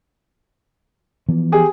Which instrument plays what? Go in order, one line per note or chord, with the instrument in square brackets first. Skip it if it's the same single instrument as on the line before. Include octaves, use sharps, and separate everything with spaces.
[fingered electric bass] E3 F3 B3
[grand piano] G4 G#4